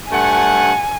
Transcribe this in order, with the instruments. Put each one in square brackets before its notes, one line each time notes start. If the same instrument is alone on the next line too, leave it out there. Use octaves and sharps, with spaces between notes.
[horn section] G2 A3 F#5 [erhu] G#5